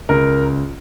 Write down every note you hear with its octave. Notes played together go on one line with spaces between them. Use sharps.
C#2 A#4